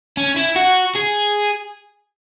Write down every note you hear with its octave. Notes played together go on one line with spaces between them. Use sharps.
C#4
E4
F#4
G#4